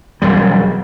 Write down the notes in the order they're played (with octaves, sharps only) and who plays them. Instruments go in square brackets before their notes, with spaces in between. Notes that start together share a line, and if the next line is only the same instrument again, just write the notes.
[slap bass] E1 F#2 G3